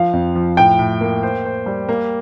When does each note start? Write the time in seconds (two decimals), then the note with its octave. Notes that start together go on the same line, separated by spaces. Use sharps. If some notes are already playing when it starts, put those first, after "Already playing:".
Already playing: F3 F5
0.13 F2
0.35 F3
0.57 A2 G5
0.79 A2
1.01 A#3
1.23 C5
1.45 C5
1.66 G3
1.89 A#3